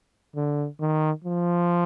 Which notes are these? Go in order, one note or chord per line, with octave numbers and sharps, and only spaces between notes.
D3
D#3
F3